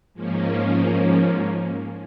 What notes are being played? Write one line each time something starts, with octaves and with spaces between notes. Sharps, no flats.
G#2 F3 A#3 C#4